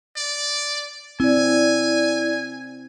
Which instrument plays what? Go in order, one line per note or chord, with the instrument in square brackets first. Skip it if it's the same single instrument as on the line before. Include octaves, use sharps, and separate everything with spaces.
[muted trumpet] D5
[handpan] C4 [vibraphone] E4 D5 [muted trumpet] G#5